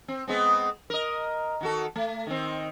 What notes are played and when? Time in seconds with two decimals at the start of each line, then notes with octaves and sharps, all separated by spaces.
0.08 C4
0.28 G#3 B3 C4
0.90 A#4 D#5
1.61 D#3 F#4 A4
1.96 A3
2.27 D#3 C4